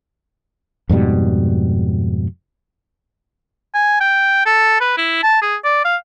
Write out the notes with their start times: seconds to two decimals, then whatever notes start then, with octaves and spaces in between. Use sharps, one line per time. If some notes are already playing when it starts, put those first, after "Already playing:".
0.89 F2 G#2 B2 G3
3.75 G#5
4.01 G5
4.46 A4
4.81 B4
4.98 E4
5.23 A5
5.42 G#4
5.64 D5
5.85 F5